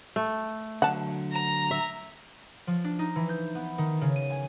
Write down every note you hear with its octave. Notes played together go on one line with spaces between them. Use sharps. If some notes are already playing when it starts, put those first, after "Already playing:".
A3
D3 F#3 F#5 A5
A#5
E5
F3
D4
D#4
E3
G6
B3
D#3
C#3
D#7
G#5